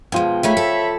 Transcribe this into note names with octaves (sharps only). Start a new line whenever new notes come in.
B2 F3 G#3 G5
G#3 A3 D#4 C#5 E5 B5
A4